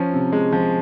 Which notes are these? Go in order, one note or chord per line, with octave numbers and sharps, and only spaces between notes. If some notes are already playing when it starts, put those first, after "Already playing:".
Already playing: F3 C#4
C3
G#3
F3